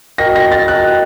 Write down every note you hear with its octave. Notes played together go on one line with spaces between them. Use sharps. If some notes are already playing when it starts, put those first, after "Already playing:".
F#4 A#4 D#5 G5 A#6
A#6
A6
F#4 A#4 D#5 G5 F#6